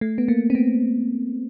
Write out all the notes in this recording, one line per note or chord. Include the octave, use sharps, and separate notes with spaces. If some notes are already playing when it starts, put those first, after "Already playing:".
A3
B3
A#3
C4
B3